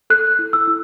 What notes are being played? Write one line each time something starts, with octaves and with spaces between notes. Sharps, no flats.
A4 F#6
E4
E6
E4